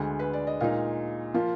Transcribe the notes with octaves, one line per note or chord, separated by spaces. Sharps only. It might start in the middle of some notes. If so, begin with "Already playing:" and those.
Already playing: D2 D3 G#3
B4
D5
D#5
A#2 G#3 D#4 F5
F3 A#3 F4